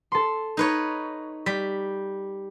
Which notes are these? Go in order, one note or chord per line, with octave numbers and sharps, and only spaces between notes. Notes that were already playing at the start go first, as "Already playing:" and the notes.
A4 C6
D#4 B4 C#5
G3 B6